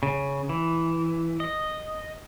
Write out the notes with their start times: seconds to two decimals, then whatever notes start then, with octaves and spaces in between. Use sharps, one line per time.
0.03 C#3
0.49 E3
1.40 D#5